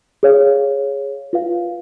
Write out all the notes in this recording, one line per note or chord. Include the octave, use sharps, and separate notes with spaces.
G#4 C#5 F5
F4 B4 F5